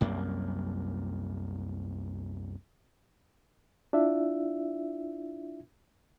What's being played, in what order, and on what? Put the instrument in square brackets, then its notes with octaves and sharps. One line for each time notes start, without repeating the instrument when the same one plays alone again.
[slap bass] C2 F#2 A#3
[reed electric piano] D4 E4 F4 E5